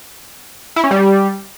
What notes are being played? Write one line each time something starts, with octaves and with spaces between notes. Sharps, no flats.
E4
C#4
G3